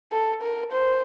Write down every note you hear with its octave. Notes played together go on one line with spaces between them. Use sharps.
A4
A#4
C5